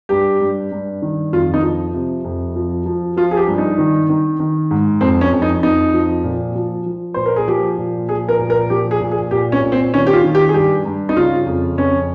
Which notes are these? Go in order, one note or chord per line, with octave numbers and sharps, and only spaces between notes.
G2 G4
G2
G2
D#3
F2 F4
D#4
F3
C3
F2
F3
F3
F3 F4
G#4
G4
G2
D#4
D#3
D#3
D#3
G#2
F2 C4
C#4
F2
D#4
F2 D#4
F3
A#2
F3
F3
A#2 C5
A#4
G#4
F3 G4
A#2
F3 G#4
A#4
A#2
A#4
F3 G4
G#4
A#2
G#4
A#2 G4
C#4
A#2
C4
D#3 C#4
G4
F4
D#3
G4
G#4
G2 G4
G2
D#4
C#3 F4
F2
F2 C#4